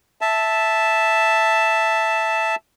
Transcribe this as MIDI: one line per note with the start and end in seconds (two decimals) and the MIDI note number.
0.21 2.55 76
0.21 2.55 81